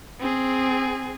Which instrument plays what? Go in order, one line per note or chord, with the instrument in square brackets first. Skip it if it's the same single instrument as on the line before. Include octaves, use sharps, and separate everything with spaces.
[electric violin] C4 G#4